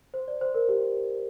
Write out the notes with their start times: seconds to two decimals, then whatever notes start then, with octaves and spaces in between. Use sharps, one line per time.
0.14 C5
0.28 D5
0.41 C5
0.55 A#4
0.69 G4